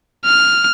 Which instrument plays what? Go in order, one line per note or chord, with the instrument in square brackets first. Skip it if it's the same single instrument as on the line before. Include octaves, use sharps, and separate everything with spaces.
[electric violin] F6